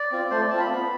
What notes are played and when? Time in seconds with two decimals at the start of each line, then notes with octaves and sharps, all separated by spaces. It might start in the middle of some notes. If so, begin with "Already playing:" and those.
Already playing: D5
0.12 C4 F4
0.31 A3 C5
0.41 D5
0.51 C4 F4 A5
0.60 B5
0.70 B3